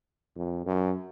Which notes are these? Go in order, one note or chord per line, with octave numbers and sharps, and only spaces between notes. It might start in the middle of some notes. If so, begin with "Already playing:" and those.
F2
F#2